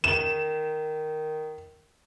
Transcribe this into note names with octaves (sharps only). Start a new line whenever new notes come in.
D#3 E7